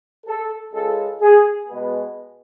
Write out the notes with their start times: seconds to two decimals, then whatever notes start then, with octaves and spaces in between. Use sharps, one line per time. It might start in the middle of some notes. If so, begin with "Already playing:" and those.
0.27 A4
0.73 C#2 C#3 G#3 A4
1.21 G#4
1.68 B2 G#3 B3